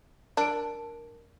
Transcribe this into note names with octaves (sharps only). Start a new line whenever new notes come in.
D4 A#4 D7